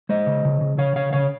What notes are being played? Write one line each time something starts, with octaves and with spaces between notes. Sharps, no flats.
G#3 C5 D#5
C#3
C#3
C#3
C#3 C#5 F5
C#3 C#5 F5
C#3 C#5 F5